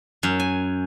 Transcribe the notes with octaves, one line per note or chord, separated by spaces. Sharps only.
F#2
G#5